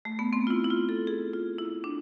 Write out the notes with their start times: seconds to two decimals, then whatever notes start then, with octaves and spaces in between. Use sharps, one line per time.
0.05 A3
0.19 B3
0.33 C4
0.47 F4
0.50 E4
0.64 E4
0.70 F4
0.89 A4
1.07 G#4
1.33 F4
1.59 E4
1.84 D4